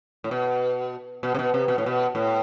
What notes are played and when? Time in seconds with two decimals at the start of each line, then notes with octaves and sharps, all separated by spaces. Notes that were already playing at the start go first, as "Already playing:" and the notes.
0.24 A2
0.31 B2
1.23 B2
1.35 C3
1.39 B2
1.54 C3
1.68 B2
1.78 A2
1.86 B2
2.15 A2